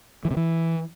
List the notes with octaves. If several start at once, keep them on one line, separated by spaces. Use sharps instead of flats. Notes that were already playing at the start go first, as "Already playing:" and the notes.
E3
C3
E3